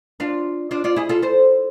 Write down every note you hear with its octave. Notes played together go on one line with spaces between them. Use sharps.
D4 F4
D4 F4
D4 F4
E4 G#4
F4 A4
A4 C5